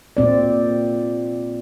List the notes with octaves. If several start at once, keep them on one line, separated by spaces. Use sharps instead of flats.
A#2 C4 D5